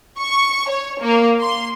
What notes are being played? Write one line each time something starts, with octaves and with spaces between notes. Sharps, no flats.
C#6
C#5
A#3
C6